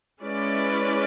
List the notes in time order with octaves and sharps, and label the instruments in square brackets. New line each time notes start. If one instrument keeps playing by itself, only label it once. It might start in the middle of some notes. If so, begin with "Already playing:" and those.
[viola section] G#3 C#4 E4 B4 D5